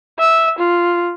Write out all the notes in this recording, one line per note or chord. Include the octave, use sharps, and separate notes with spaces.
E5
F4